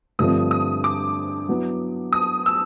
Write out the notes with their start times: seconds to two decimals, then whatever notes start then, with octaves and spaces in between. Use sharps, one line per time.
0.19 G2 D3 F3 A3 C4 D#6
0.51 D#6
0.84 D6
1.48 F#3 B3 E4
2.13 D#6
2.46 E6